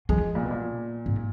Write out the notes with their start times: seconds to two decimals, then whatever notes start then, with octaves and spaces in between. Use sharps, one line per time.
0.09 F3 G#3
0.35 A#2
0.43 B2
0.51 A#2
1.06 G#2